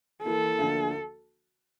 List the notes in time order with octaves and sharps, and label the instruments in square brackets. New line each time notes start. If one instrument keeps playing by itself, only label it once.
[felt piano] E3 A#3 E4 A#4 [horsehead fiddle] A4
[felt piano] D2 D3 F3 A#3 D4